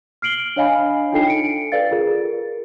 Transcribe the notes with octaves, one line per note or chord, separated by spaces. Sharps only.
F6 C7 D7 F#7 G7
D4 C#5 D#5 F5 G#5 B5
D4 D#4 F4 A4 G5 C7
C#7 D7
A4 B4 D5 F5 A6
F4 G#4 A#4